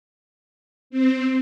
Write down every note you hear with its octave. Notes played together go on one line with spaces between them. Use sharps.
C4